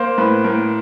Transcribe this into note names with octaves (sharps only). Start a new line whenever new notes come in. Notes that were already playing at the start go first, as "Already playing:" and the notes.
Already playing: A#3 C5
A2 B4
A2 A#4